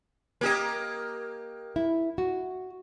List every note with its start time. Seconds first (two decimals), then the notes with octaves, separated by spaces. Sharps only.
0.41 A#3 G4 D#5
1.76 E4
2.18 F#4